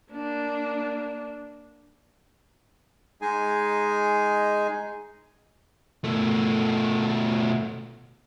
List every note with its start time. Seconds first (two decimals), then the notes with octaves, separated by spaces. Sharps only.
0.11 A#3 D4
3.22 G#3 D#4 G#4 G#5
6.04 B2 A3